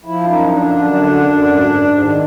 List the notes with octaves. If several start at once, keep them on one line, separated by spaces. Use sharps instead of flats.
F3 E4
F#2 D#4
F3
D4
D3
F#2
D3
F#2
F#2
G#2
G#2
G#2
D#3